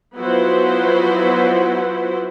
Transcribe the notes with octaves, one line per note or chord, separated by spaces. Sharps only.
F3 F#3 B3 E4 F#4 C5